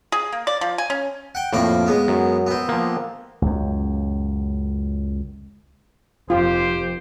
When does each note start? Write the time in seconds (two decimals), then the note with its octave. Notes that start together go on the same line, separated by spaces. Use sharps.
0.12 G#4
0.32 A#3
0.47 D5
0.61 F3
0.78 G#5
0.90 C#4
1.35 F#5 G5
1.53 F2 A2 F3 A#3 D6
1.86 G#3 B3
2.08 F#2
2.47 B3 C4
2.69 F3 A#3
3.42 C#2 F#2
6.30 F1 F2 F4 G4 C5